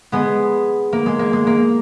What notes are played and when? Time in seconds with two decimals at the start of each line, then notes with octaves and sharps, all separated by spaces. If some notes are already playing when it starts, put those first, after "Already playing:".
0.12 G#3 B3
0.93 A#3
1.06 G#3
1.19 A#3
1.33 G#3
1.47 A#3